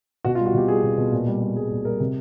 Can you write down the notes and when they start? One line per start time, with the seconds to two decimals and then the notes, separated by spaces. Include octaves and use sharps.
0.24 B2 F#4
0.35 F4
0.40 G3
0.46 F#4
0.54 B2 G4
0.68 G3 G#4
0.83 B2
0.97 B2
1.12 A#2
1.27 G3
1.41 G3
1.56 G3 G#4
1.71 A#2
1.85 G3 A#4
2.00 C3